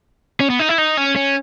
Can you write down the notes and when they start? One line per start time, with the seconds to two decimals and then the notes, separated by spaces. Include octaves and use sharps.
0.40 C#4
0.50 B3
0.59 D#4
0.69 E4
0.78 D#4
0.97 C#4
1.16 C#4